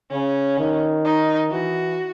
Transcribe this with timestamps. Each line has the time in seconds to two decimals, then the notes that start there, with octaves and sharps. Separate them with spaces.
0.11 C#3 C#4
0.58 D#3
1.05 D#4
1.51 E3 F#4